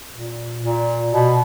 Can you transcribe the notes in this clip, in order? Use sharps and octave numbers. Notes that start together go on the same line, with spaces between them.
A#2
A#2
B2